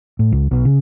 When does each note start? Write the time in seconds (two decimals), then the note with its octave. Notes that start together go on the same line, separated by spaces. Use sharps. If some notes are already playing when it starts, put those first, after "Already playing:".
0.19 A2
0.32 C#2
0.51 B1
0.65 C#3